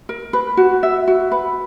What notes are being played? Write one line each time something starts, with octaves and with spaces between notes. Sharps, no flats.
A#4
B4
F#4
E5
F#4
B4